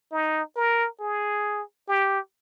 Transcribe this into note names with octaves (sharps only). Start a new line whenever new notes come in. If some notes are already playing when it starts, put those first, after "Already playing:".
D#4
A#4
G#4
G4